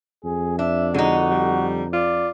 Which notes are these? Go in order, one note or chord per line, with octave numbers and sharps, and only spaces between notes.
F2 G#4
D4 E5
D3 G#3 D#4 F#4
G3
F4 D5